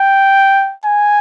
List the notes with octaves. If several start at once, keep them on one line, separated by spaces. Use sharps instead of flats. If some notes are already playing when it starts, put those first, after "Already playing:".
Already playing: G5
G#5